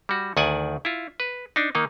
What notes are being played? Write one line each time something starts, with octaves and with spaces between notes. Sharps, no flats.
G3 F#4
D2 D#3 D5 F#5 G#5
E4 F4
B4
D4 D#4
D#3 A#3 D#4